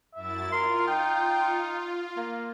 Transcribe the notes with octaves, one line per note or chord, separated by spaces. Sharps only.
F#2 E4 E5 A6
F4 A#4 C6
D#4 G5
A#3